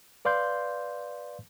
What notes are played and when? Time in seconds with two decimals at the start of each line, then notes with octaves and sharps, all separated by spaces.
0.25 B4 D5 F5 C6 G6